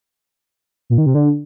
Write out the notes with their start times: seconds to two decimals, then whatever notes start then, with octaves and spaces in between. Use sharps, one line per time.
0.90 A#2
0.98 D#3
1.06 C3
1.14 D3